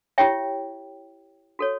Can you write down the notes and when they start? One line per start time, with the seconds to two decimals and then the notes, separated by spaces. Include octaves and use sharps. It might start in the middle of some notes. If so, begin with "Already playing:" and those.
0.18 E4 G4 C#5 E5 G5
1.59 F#4 A4 C#5